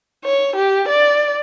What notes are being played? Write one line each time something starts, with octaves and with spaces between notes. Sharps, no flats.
C#5
G4
D5